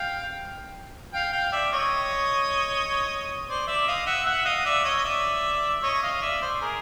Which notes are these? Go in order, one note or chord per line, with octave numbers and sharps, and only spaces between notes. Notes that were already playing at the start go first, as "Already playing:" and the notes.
Already playing: F5 G5
F5 G5
F5 G5
D5 E5
C#5 D#5
C5 D5
D5 E5
D#5 F5
E5 F#5
E5 F#5
D#5 F5
D5 E5
C#5 D#5
D#5
D5 E5
C#5 D#5
D#5 F5
D5 E5
C5 D5
G#4 A#4